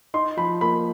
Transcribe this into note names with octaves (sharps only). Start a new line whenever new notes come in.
D#4 C6
F3 B5
A#3 B5